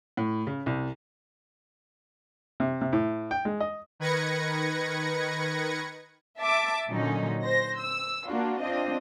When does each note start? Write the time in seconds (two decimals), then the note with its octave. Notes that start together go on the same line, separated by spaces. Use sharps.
0.17 A2
0.47 C#3
0.66 C2
2.60 C3
2.81 C3
2.93 A2
3.31 G5
3.45 G#3
3.60 D#5
4.00 D#3 B4 G#6 A#6 C#7
6.40 E5 A5 D6
6.89 A#2 D3 F#3 C#4 D#4
7.44 C5 A#6
7.79 E6
8.28 A#3 D4 F4 F#4
8.60 C4 D4 F4 D#5